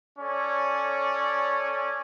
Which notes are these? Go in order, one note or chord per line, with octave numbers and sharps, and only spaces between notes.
C#4 A4 C#5 D5